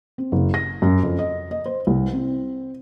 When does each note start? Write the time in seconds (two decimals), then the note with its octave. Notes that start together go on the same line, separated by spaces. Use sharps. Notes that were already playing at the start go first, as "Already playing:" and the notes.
0.18 C4
0.32 F#1
0.54 A#6
0.82 F#2
1.03 F2
1.19 D#5
1.51 D#5
1.66 C5
1.87 C2
2.13 C4